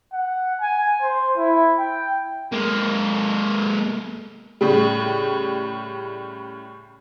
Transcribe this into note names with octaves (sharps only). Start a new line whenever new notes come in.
F#5
G#5
C5
E4
G5
G#3 A#3
A2 C#3 G3